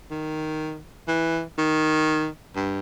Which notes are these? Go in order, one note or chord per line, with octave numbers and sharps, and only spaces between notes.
D#3
E3
D#3
G2